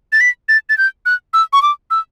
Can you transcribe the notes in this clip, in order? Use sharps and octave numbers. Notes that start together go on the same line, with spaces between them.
A6
B6
A6
A6
G6
F#6
E6
C#6
D6
E6